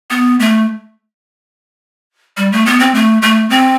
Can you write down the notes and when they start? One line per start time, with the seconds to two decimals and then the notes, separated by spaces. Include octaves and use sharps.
0.10 B3
0.40 A3
2.37 G3
2.52 A3
2.66 B3
2.80 C4
2.95 A3
3.22 A3
3.50 C4